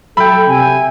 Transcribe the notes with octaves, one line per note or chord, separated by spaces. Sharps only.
F#3 A4 E5 G5 B5
C3 G#5